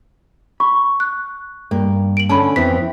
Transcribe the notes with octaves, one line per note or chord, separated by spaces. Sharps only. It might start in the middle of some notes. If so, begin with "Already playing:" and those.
B5 C#6
F#6
G2 A#3
D7 F#7
D3 C#4 A5 B5
F2 E3 B3 C4 B6